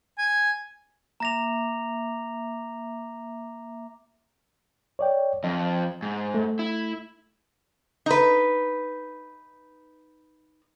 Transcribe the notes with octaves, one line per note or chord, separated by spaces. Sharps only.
G#5
A#3 E5 A#5 D6 A#6 F7
C#5 D5 G5
F2 D#5
G#2
A3
E4
D#4 B4